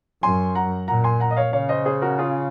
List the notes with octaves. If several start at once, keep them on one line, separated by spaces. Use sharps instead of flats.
F#2 G#5 C6
F#5 A#5
A#2 F#5 A#5
G#5 C6
F#5 A#5
D#5
C#5 F5
C#3 C#5 F5
C5 D#5
G#4 C5
F#4 A#4
F4 G#4